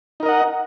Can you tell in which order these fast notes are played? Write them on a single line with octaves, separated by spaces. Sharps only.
D#4 A#4 D#5 F#5